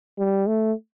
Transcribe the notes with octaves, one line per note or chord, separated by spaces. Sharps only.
G3
A3